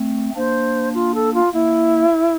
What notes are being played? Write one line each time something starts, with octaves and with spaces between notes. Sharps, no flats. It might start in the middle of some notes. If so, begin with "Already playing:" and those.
Already playing: A3 C4
A#3 D4 C5
F4
A4
F4
A#3 E4